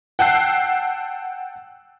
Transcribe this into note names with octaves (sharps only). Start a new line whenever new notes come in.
F#5 G5 A5 E6 F#6 C7